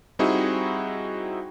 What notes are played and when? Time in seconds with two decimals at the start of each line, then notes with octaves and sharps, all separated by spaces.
0.19 G3 C4 D#4 E4 F#4 G#4